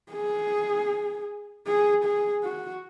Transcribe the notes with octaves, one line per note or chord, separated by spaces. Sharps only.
G#4
G#4
G#4
F#4